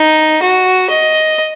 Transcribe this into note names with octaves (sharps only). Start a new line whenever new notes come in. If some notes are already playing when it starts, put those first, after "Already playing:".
Already playing: D#4
F#4
D#5